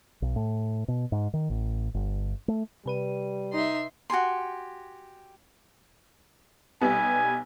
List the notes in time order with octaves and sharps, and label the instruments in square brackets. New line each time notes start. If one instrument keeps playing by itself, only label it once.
[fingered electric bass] B1
A2
B2
G#2
D#3
A1
G1
A3
[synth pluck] C3 B4 D#7 [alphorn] G3
[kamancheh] D#4 [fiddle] E5 C6
[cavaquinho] F#4 G4 G#5 C6
[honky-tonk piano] B1 G3 B3 [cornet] G#5